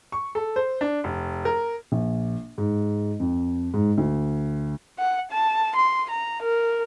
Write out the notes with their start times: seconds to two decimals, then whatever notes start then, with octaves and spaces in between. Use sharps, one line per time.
0.12 C#6
0.35 A4
0.56 C5
0.81 D4
1.04 F1
1.45 A#4
1.92 A#1
2.58 G#2
3.20 F2
3.74 G#2
3.98 D2
4.99 F#5
5.31 A5
5.76 C6
6.10 A#5
6.42 A#4